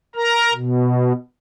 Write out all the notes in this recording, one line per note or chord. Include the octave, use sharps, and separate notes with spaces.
A#4 A#5
B2